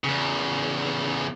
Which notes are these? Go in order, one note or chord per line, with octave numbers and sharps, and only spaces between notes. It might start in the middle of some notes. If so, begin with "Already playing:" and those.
E2 C#3